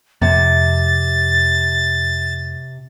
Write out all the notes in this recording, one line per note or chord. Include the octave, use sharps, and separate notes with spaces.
F2 C3 A6